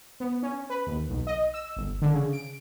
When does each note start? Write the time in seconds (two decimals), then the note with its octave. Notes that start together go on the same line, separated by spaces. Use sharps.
0.20 B3
0.42 C#4
0.70 B4
0.86 D#2
1.09 B1
1.27 D#5
1.54 E6
1.76 G1
2.02 D3
2.13 C#3
2.33 D7